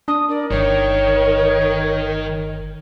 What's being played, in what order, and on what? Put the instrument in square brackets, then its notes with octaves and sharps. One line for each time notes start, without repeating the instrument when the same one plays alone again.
[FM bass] D4 [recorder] D#6
[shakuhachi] A#4 [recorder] D5
[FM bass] G1 [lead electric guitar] D#3 [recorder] C#5